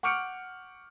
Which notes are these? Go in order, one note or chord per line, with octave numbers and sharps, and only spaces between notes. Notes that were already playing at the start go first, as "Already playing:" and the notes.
F#5 C#6 D6 F6 C#7 D7